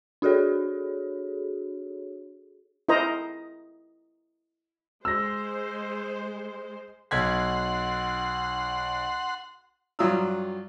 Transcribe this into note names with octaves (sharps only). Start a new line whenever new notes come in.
D4 F#4 G#4 A4 C#5
E4 A#4 C5 D#5 A#5
G#3 C5 E6 A#6
B1 F#5 C6 G#6 B6
G2 F#3 F4 A#5 D#6 E6